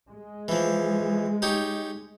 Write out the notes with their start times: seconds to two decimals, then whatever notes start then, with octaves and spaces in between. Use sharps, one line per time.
0.10 G#3
0.48 E3 F3
1.42 D#4 G4 C#5